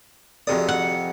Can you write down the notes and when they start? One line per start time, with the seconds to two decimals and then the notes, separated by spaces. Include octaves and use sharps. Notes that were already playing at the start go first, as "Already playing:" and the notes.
0.47 F2 C3 F#4 G#4 D5 D#6
0.68 F#5